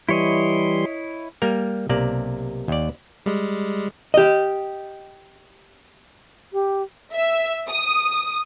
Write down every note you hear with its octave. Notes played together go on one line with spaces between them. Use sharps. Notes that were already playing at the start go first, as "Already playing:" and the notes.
E3 G3 E4 C#5 D#5 C6
G3 A#3 A#4
B1 C3 A#3 D5
D#2 D5
G3 G#3
G4 D#5
G4
E5
D#6